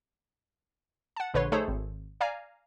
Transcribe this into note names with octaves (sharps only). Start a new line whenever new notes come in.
F#5 A5
A#1 D3 B4 C#5 C6
A3 D#4 G#4 A4 C5 C#5
G#1
D5 F5 G#5 A#5